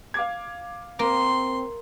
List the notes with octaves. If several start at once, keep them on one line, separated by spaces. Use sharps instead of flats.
F5 D6 G#6
A#3 C4 C6